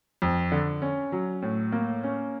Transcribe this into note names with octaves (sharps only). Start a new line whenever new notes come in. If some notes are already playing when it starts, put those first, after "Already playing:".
F2
D3
C#4
F#3
A2
A#3
C#4